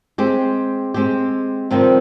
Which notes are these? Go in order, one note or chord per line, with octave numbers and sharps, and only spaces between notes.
G#3 C4 G4
G#3 C4 G4
F2 C3 D#3 G3 C4